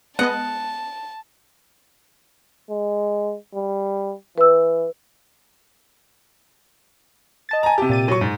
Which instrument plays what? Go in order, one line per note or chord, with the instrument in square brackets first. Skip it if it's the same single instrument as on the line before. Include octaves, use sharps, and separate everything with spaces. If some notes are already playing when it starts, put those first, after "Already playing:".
[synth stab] G#3 B3 D#5 [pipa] F#5 [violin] A5
[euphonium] G#3
G3
[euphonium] E3 [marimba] B4 E6
[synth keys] D#5 A5 A6
[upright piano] G#5 A#5
C3 G4
[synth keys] A#2 A6 D#7
[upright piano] F#3 C#6
G#2